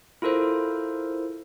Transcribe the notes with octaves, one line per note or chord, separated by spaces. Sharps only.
E4 F4 A4 A#4 C5